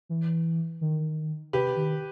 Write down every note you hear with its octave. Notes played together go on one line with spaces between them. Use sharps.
E3
D#3
C3 G4 B4
D#3